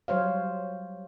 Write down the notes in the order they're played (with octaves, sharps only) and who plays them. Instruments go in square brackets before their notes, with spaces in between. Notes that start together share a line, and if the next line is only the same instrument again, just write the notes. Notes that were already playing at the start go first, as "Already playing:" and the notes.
[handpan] F#3 G3 C5 C#5 F5